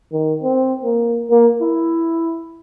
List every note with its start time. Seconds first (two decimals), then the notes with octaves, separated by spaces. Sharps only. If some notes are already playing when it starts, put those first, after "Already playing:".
0.12 D#3
0.43 C4
0.83 A#3
1.30 A#3
1.61 E4